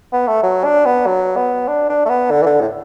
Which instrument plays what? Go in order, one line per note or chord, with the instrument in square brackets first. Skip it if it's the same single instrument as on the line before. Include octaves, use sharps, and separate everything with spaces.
[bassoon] B3
A3
F#3
D4
B3
F#3
B3
D4
D4
A3
B3
D3
E3
D3
A2